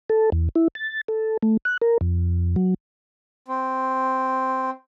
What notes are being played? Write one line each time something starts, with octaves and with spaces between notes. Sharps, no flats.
A4
E2
E4
A6
A4
A3
F#6
A#4
F2
F#3
C4